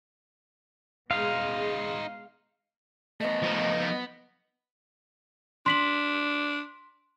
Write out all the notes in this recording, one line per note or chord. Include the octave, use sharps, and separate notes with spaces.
B2 G#3 D#4 F4 F5
A3 B3 D#5
F3 D#4
B3
D4 C6 B6 F#7